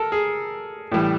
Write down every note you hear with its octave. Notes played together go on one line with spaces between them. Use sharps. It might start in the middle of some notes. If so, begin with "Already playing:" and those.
Already playing: A4 A#4
G#4
A2 E3 G3